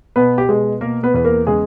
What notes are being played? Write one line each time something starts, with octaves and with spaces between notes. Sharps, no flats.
B2 B3 B4
G4
B2 G#3 G#4
B2 A#3 A#4
B3 B4
E2 B4
A#3 A#4
C#3 G#3 G#4